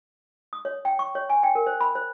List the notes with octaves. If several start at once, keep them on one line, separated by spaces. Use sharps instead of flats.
D#6
C#5
G5
C#6
C#5
G#5
G5
A#4
C5
B5
C5